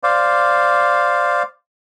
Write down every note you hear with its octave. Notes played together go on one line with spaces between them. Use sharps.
C5 D5 F5